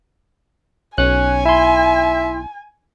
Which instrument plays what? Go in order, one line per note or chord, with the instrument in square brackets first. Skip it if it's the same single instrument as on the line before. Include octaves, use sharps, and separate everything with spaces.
[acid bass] B1 [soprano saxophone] C#4 [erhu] G#5 [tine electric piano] F#6
[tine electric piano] E4 C6 [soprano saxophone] E5